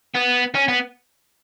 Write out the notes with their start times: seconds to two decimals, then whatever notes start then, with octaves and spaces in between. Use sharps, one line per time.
0.15 B3
0.55 C#4
0.68 B3